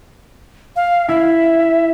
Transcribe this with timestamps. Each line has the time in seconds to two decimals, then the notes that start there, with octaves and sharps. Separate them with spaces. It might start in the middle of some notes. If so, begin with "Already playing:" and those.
0.76 F5
1.08 E4 E5